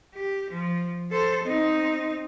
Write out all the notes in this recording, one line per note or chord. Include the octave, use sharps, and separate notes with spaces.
G4
F3
A4 C5
C4 D#4